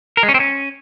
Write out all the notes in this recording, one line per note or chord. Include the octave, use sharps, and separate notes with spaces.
A#4
G#3
C#4
C4
C#4